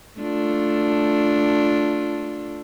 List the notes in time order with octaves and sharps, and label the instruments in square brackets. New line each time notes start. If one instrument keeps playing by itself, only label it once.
[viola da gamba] A3 D4 F4